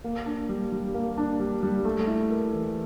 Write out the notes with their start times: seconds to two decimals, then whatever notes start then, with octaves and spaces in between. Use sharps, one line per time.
0.04 A#3
0.26 D4
0.49 G3
0.72 G3
0.94 A#3
1.18 D4
1.40 G3
1.63 G3
1.85 A3
2.07 E4
2.30 A#4
2.53 E3